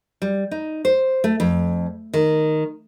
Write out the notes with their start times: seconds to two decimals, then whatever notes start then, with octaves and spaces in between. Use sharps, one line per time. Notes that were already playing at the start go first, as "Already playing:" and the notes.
0.22 G3
0.51 D#4
0.85 C5
1.24 A3
1.40 F2
2.14 D#3